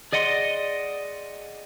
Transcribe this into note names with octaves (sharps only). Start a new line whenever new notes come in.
G#4 D5 D#5 F#5 B5 C6